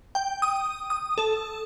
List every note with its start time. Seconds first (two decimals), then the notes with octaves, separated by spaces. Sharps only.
0.15 G5
0.42 D#6
0.90 D#6
1.18 A4